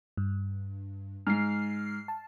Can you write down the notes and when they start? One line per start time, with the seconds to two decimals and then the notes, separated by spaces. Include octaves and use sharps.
0.17 G2
1.27 G#2 F6 C7
2.08 A5